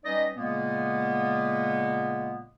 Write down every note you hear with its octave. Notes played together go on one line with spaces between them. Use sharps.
G3 C#4 D#4 B4 D5 D#5
A#2 C#3 G#3 A#3 B3